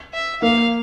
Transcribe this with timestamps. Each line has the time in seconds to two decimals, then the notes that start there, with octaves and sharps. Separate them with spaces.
0.14 E5
0.42 A#3 F5